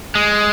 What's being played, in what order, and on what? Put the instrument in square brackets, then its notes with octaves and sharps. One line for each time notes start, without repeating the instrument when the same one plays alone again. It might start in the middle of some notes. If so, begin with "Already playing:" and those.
[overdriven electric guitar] G#3